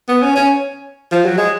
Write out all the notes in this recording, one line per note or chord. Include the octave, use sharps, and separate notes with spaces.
B3
C#4
C#4
F3
F#3
G#3